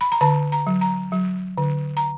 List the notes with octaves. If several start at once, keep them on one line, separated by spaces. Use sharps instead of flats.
B5
A#5
D3 A5
A#5
F#3
A#5
F#3
D3
A#5